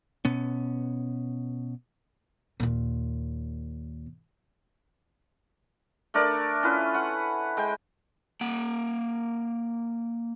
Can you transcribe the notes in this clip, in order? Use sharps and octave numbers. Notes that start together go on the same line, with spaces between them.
B2 B3 C#4
D#2 A#2
A3 D4 A#4 D5
C#4 E4 F4 B4
F#5
G#3 G5
A#3 F#5